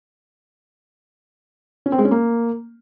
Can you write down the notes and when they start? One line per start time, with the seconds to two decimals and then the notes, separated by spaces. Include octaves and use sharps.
1.86 C#4
1.92 C4
1.99 G#3
2.05 C#4
2.11 A#3